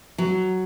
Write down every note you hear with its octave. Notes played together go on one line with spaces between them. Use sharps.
F#3